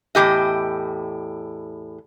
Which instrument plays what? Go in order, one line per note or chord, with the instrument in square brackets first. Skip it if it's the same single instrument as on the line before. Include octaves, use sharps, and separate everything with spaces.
[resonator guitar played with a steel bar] E2 A2 E3 G4 D#5